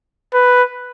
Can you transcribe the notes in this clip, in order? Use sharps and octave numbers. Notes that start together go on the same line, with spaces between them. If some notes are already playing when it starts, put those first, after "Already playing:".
B4